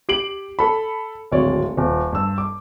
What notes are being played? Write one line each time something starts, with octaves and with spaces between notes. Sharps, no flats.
G4 C7 D7 F#7
A4 B5
D1 G#1 C#5 D5
D#1
G2 E6
D6